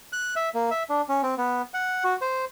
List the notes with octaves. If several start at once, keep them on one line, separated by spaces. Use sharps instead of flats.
F#6
E5
A#3
E5
D4
C#4
C4
B3
F#5
F#4
C5